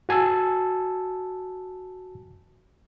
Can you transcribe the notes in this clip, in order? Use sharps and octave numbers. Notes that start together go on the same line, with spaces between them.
F#4 G#5 A5 E6